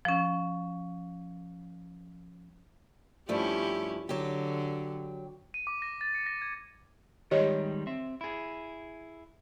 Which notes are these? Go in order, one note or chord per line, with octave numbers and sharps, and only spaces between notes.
F3 C#4
G2 F3 A3 C#4 E4 G4
D3 F#3 G4
D#7
D6
A#6
A6
C#7
A#6
G#6
D#3 G3 G#3 G4 C#5 D#5
C4 E5
E4 G#4